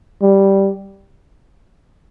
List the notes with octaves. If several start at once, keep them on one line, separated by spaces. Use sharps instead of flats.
G3